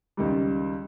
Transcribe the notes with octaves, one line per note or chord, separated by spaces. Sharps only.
C#2 D#3 G3